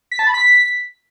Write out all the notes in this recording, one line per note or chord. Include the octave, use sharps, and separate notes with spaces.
B6
A5
B5
B6